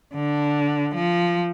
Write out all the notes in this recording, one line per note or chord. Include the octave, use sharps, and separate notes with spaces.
D3
F3